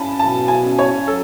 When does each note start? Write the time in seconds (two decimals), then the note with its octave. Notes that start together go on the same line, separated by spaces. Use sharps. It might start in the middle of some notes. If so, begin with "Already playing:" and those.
Already playing: C#4 A5 B5
0.19 B2 A5
0.48 G#5
0.63 C#4
0.79 C#5
1.07 F#3 A4